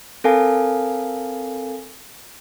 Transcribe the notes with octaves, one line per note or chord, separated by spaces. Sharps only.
C4 A4 A#4 F5 G#5